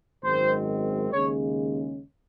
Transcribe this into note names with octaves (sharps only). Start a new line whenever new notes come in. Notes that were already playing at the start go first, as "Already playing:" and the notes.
G#1 F#2 D#3 G#3 C4 C5
D#2 C#3 G#3 C#4 C#5